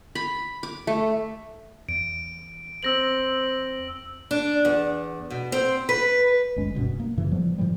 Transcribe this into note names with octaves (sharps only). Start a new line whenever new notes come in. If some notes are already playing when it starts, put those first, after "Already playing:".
B5
D6
A3
E2 D7
C4 E6 A#6 F#7
D4
E2
B2
C4
B4
G1 D2 G#3 C#4
D#1 G2 B2 C#4
A#3
F#2 A2 C#3 E3
F3 G3 B3
A2 D3 F3 G3